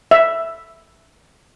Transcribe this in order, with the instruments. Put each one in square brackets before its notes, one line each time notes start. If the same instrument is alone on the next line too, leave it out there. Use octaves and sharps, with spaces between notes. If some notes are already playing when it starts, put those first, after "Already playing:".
[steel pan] E5